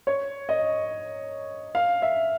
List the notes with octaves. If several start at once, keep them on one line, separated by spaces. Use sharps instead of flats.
C#5
D#5
F5
E5